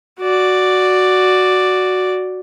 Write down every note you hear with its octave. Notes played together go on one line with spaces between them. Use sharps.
F#4 D5